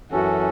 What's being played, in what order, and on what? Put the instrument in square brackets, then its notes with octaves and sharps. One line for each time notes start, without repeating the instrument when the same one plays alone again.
[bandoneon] F#2 E3 C#4 A4 [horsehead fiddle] F#4